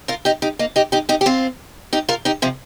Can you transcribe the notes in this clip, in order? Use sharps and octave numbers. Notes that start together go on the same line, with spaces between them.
F4 A#4
D#4 G4
D#4 G4
A#3 D#4
D#4 G4
D#4 G4
D#4 G4
G4
C4 F4
D#4 G4
F4 A#4
D#4 G4
C3 F3